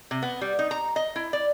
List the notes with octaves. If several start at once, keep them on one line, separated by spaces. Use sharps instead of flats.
C3
B3
G3
D#4
A#5
D#5
E4
D5